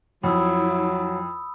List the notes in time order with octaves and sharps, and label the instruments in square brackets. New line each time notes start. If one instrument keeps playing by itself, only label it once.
[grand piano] F2 [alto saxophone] F#3 [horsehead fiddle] E4 [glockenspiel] B5 D#6 E6